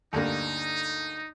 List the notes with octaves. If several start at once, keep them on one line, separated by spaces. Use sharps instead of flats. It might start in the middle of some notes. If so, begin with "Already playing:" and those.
D2 G2 A#3 D#4